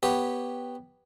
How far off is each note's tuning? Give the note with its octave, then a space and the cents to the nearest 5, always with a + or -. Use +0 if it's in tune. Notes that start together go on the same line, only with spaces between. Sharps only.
B3 +0 G4 +0 C#5 +0